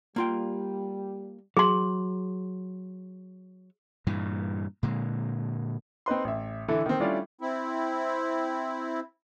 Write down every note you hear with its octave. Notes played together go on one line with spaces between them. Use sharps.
G3 A#3 F4 G5
F#3 G#4 C6
G2 A#2 E3
A#2 D3 G#3
C4 D#4 B4 C6
A1 E5
D3 E3 E4 A4
D#3 C4
G3 A3 C#4 D4 E4 F4
C4 E4